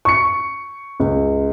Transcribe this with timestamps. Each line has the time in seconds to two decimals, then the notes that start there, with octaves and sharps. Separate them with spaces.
0.05 C#6 C#7
1.00 C#2